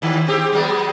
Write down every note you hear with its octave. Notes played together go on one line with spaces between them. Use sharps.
D#2 D#3
C4 G4 G#4
F#3 G#3 B3